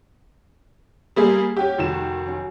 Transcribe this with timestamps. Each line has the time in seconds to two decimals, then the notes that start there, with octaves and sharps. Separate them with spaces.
1.16 G3 A#3 G#4 C6
1.57 C#4 F#4 G4 F#5 G5
1.78 F1 D#3 E7
2.26 F#3 C#4